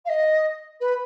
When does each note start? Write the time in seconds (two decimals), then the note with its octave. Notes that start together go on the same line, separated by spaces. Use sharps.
0.05 F5
0.09 D#5
0.80 B4